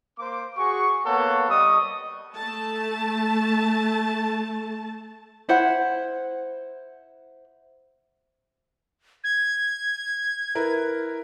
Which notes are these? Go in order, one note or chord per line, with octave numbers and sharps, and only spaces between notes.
A#3 C5 D6
F#4 G#4 C#6
A#3 B3 A4 C#5 F#5
G3 D#5 C#6 D#6
A3 A5
E4 C5 F#5
G#6
E4 A#4 B4